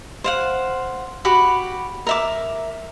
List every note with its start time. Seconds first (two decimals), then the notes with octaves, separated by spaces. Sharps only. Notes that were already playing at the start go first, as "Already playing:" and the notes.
0.24 C5 F5 F#5
1.25 F#4 G4 B5
2.07 A#4 E5 D6